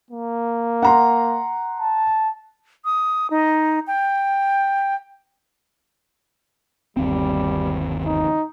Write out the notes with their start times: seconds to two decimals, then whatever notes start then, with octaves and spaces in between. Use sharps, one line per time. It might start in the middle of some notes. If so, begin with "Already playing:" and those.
0.11 A#3
0.82 F#5 A#5 C6
1.80 A5
2.85 D#6
3.30 D#4
3.87 G5
6.97 G1 D#2 G3 C4
8.06 D#4